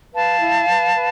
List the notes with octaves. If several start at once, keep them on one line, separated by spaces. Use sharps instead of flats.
B4 F5 A5
E4
B4
B4